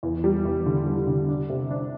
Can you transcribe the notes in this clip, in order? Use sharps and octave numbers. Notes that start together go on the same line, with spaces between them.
E2
G3
E2
D3
G3
D3
D4
C3
D4